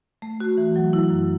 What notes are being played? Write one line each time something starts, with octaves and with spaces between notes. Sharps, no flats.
A3
F#4
E3
F#3
E4
F#2